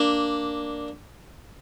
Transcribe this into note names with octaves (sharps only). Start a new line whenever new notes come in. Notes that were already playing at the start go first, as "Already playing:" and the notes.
Already playing: A#3 D4